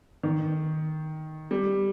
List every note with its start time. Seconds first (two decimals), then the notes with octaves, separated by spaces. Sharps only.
0.23 D#3
1.51 G3